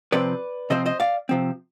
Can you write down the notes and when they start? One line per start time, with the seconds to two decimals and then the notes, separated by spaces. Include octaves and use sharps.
0.12 C3 F3 C4 B4 D5
0.70 C3 F3 C4 C5 D#5
0.86 C5 D#5
1.00 D5 F5
1.29 C3 F3 C4